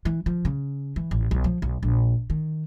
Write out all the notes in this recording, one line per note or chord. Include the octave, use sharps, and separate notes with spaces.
E3
F3
C#3
E3
A1
B1
F3
B1
A#1
D#3